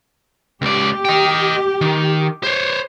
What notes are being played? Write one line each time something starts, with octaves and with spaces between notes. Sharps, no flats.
C#2 G4 D5
D#5 G5
D#3
C5 C#5